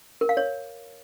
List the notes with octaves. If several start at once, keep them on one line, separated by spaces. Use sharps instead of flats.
A#4
F5
C#5